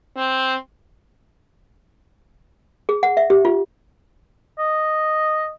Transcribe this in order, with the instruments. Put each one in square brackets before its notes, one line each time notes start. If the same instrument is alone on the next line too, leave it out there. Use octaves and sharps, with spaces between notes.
[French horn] C4
[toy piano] G#4
F#5
E5
G4
F4
[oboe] D#5